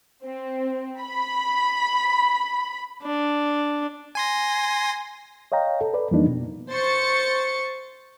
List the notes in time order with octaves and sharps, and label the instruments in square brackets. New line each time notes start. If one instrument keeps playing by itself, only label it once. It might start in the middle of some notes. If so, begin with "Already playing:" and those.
[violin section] C4
B5
[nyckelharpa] D4
[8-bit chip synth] G#5 C6 A#6
[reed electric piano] C#5 D#5 F5 G5 A#5
A4
B4 D5
F2 E3 G3 A#3 D4 D#4
B2
[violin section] C5 C#6 A6 C#7